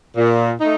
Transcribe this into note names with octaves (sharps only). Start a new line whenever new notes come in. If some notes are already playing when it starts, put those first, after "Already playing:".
A#2
A3 D#4